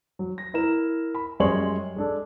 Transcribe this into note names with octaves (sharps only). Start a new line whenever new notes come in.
F#3
A#6
E4 A#4 E7
B5
F#2 G3 G#3 C#5 C6 F#7
G#3 D4 A4